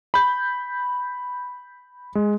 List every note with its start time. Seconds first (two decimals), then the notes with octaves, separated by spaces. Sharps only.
0.14 B5 G6
2.15 G#3